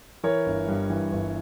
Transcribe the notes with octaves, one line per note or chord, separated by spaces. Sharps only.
E3 A#4 C#5
G1
G2
E3
G1